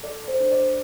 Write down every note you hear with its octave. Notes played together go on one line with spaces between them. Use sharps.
A4 D5
C5
D4
D5